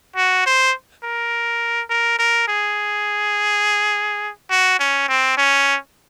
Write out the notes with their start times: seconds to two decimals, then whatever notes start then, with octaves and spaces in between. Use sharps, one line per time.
0.16 F#4
0.46 C5
1.04 A#4
1.90 A#4
2.19 A#4
2.48 G#4
4.50 F#4
4.80 C#4
5.08 C4
5.37 C#4